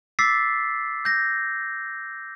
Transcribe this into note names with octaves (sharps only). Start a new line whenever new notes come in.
D6 E6 A6 B6 C7
G6 A#6